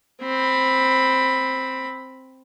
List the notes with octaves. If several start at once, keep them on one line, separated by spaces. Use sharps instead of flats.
C4 B5